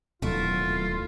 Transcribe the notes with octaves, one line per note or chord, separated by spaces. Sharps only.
D1 D#2 B2 F#3 A3 E4 F4